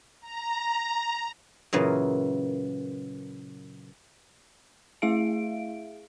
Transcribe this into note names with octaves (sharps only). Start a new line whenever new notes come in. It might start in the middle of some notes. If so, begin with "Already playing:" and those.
A#5
F#2 A#2 C#3 E3
A3 E4 G#4 E5 F5 D7